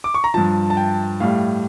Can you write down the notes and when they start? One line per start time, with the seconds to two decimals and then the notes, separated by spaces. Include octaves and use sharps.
0.04 D6
0.14 C#6
0.24 A#5
0.34 G2 F3 A5
0.70 A5
0.77 G5
1.20 A2 G3 F5